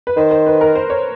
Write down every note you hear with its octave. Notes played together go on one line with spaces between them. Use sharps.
B4
D#3 C5
C5
B4
A#4
C5
C#5